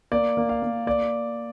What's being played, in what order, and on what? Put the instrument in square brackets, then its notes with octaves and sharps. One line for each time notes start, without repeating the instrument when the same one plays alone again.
[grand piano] A#3 D5
A#3
F5
A#3
A#3 D5